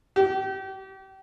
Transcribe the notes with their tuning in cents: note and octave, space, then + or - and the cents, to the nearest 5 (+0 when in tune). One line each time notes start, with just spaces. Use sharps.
G4 -35